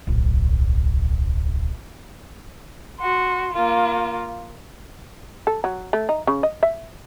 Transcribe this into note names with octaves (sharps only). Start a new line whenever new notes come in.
D1 B1
F#4 C6
A#3 F4
A4
F#3
A3
D#4
C#3
D#5
E5